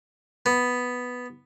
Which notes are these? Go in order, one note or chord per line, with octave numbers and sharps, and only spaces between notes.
B3